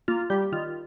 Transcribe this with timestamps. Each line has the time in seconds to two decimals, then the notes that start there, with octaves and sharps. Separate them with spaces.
0.08 A#3 F4
0.30 G3 G4
0.52 D#3 F4